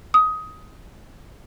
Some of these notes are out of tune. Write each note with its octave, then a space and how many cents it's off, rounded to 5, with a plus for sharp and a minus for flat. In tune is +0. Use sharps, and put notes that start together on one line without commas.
D#6 +15